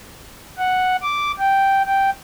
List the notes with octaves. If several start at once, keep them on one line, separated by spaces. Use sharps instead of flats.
F#5
D6
G5
G5